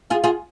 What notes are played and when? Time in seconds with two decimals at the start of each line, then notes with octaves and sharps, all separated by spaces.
0.10 F4 G#4
0.24 F4 G#4